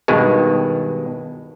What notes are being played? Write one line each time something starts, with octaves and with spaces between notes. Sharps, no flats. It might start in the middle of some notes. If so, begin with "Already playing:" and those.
G2 B2 D#3 G#3